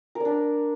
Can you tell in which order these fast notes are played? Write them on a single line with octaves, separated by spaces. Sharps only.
A#4 D5 D4